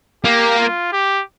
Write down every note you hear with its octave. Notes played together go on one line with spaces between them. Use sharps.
A#3 G4
F4
G4